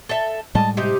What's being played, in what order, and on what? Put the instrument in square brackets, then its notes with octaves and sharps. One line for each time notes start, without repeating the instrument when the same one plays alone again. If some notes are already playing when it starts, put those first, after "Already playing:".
[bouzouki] A4 E5
[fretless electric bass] A2 G3 G#3 [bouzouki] D#5 A5
[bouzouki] C3 D#4 G4